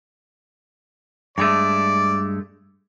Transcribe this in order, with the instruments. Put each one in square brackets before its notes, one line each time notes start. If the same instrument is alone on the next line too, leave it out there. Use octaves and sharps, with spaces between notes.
[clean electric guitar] G2 G#3 A3 [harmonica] D5